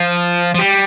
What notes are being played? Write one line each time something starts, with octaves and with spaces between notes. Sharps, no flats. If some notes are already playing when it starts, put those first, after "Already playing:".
Already playing: F3
F3
G3